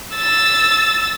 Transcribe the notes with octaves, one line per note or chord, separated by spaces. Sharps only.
E6 A6